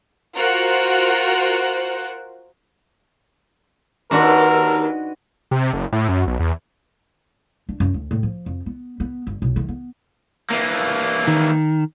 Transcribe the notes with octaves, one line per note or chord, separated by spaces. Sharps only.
F4 F#4 A#4 C5 F#6 C#7
D#2 D4 F#4 A#4 B4
C3
F#1
A2
F#2
B1
E2
D4
F#2
D2
A2
F3
F2
B3
B3
G1
B1
D#3
B3
E3 A#3
D#3